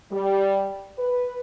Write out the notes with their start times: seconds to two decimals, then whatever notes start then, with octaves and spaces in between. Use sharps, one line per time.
0.11 G3
0.98 B4